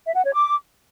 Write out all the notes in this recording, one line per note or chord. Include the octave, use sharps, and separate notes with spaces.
E5
F#5
C#5
D6